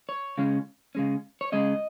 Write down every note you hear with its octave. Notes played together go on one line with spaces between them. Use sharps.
C#5
C#3 G#3 C#4
C#3 G#3 C#4
C#5
C#3 G#3 C#4 D#5